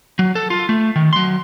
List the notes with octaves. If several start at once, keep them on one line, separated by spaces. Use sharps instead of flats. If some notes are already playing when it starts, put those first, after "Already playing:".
F#3
A4
F4
A3
D#3
F#3 C6